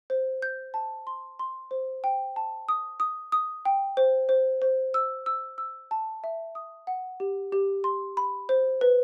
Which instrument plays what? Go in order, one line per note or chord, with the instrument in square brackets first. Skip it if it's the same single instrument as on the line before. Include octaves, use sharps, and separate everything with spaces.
[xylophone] C5
G6
A5
C6
C6
C5
G5
A5
D#6
D#6
D#6
G5
C5
C5
C5
E6
E6
E6
A5
E5
D#6
F#5
G4
G4
C6
B5
C5
B4